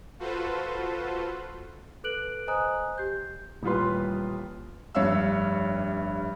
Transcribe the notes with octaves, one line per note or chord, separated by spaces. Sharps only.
F4 F#4 A4 B4 C5
A4 B4 F#6 D7 F#7
C5 D#5 G#5 A#5 D#6 F#6
G4 G6
D#1 A1 G3 F4 B4 C6
F1 G2 C#5 E5 F5 E6